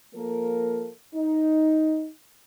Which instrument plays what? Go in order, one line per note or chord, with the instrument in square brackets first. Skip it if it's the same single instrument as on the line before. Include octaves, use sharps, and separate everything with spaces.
[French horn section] F3 A#3 A4 A#4
D#4